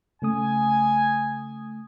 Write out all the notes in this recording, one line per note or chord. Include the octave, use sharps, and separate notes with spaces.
C#3 A3 G#5 D#6